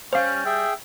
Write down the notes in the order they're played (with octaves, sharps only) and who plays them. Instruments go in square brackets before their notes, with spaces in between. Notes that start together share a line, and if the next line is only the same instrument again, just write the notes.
[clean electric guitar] G3 [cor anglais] C#4 [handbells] C5 F5
[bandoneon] G#4 G5 [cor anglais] E5